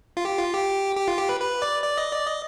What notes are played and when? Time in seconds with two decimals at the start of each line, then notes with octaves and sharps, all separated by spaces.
0.17 F4
0.25 G4
0.38 F4
0.54 G4
0.96 G4
1.08 F4
1.18 G4
1.29 B4
1.40 B4
1.62 D5
1.83 D5
1.98 D#5
2.11 D5
2.26 D#5